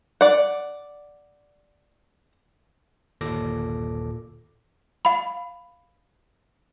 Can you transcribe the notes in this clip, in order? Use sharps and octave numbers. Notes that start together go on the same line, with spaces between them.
D5 F#5
G1 D#2 A#2 A4 D6 A#6
F5 B5